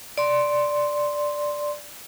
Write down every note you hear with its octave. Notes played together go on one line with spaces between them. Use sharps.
D5 C6